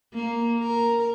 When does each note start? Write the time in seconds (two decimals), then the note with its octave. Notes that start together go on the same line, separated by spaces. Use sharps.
0.14 A#3
0.59 A#4